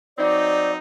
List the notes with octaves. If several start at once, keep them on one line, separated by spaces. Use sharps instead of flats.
F#3 C4 D#4 D5